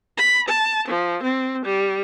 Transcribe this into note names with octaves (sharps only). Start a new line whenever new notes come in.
B5
A5
F3
C4
G3